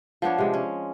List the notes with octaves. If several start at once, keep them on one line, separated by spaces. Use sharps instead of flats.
F3 B3 D4 C#5
C3 G#3
C#4